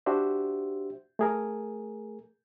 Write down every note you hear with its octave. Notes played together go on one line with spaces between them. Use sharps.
D4 F#4 G4 C5 E5
A3 G#4 A#4